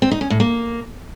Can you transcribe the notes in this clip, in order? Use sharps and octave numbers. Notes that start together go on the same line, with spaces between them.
C4
D#4
C#4
A2
A#3